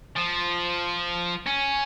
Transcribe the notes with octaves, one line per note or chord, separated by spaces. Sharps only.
F3
C#4